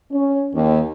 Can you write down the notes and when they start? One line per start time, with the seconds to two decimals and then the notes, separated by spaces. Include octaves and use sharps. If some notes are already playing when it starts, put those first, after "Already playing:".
0.11 C#4
0.55 D#2